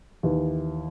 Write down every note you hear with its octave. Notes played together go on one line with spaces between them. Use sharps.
D#2 E3